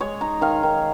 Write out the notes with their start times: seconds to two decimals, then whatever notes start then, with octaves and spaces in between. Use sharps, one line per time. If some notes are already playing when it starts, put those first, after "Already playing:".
0.01 G#3 C#5
0.21 D#4 A#5
0.41 D#3 F5
0.63 D#3